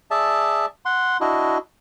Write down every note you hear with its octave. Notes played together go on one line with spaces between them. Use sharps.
G#4 D5 E5 A5
F#5 C6
D4 E4 F#4 D#5